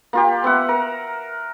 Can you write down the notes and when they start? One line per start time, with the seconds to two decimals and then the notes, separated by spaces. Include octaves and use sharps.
0.13 A#3 F4 G4
0.44 B3 E5 F#5
0.69 A#4